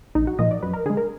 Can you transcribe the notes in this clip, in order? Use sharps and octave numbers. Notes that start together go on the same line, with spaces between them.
A#1 D#4
F#4
A#2 F3 D#5
D5
F#2 B4
A#4
D3 G#3 G#4
A#4